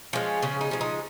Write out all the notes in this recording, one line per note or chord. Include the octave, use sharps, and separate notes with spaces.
F3 G#3 C#4
C#3 C#4
D#4
F3 G#3
D#4